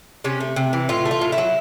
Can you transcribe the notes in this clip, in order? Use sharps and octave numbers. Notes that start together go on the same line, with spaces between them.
C3 C#4
A3
C3
E3
A2 F4
A3
F4
A2
E4
F#3